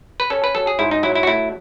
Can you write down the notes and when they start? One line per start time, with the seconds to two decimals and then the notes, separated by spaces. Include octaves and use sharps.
0.20 B4
0.30 C#4 A4
0.44 B4
0.55 F#3 A4
0.67 G#4
0.79 G#2 E4
0.91 D#4
1.03 F#3 E4
1.15 E4
1.23 F#4
1.27 A3 E4